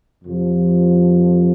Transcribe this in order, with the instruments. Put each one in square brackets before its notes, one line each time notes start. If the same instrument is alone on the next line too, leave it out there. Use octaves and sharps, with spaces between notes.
[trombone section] F2 C3 F3